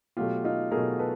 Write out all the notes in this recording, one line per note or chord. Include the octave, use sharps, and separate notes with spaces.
B2 F#3 A3 F4 G4
D#4 F4
B2 F#3 A3 G#4 A#4
A4 B4